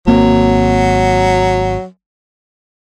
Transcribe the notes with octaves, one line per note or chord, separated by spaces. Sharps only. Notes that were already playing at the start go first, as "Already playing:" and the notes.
G#1 F#3 A#3 C4